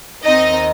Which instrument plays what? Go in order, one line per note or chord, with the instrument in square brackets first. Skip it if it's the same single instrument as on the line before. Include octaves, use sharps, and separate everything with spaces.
[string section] D#2 D#3 C4 D#4 D#5